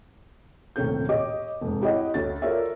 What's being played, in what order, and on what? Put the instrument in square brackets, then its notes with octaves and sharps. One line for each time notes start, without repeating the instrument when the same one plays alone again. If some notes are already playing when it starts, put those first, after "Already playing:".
[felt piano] D#1 A2 C3 C#4 A4 G6
G4 C#5 D#5 D6
F1 G#2
E4 G4 C#5 D#5 F#5
D2 C#5 A6
F4 A4 A#4 C#5 D5 E5